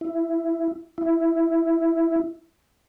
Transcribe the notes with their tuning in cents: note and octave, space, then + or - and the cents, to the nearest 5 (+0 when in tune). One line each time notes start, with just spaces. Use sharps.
E4 +10
E4 +5